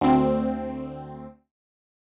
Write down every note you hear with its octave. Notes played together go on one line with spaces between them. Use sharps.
D2 C4